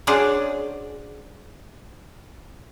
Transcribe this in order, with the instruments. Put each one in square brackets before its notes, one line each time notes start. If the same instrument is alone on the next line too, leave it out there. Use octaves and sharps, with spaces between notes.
[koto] F#3 C#4 D4 G#4 C5 D5